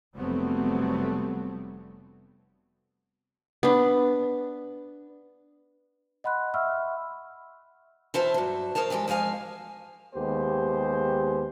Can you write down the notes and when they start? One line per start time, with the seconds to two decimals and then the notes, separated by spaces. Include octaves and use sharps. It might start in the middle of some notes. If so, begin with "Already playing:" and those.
0.16 F1 F#3 G3 A3 B3 C4
3.63 B3 D4
6.24 D#5 F#5 B5 C6 F#6
6.54 E5 F#5 B5 C#6 E6 F6
8.14 E3 F4 C5 C#5 E5 A5
8.34 G2 F#3
8.75 G#4 A#4 C5 C#5 A5
8.90 E3 F3 G#3 G4
9.08 F2 F3 G#3 F5 G#5
10.15 D#2 G#3 B3 G4 C5